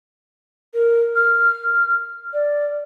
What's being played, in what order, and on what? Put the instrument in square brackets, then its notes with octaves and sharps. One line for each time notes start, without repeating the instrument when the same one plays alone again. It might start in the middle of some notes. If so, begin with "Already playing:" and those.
[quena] A#4
F6
D5